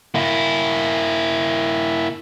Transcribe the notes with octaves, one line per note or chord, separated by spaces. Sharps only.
A#3 E4